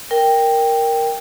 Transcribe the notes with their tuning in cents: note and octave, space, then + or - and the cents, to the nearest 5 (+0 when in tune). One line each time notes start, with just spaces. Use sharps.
A#4 +0 G5 +5